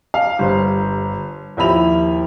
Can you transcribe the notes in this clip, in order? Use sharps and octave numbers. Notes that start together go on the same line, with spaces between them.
F5
G1 C5
D#2 F3 E4 B5 F7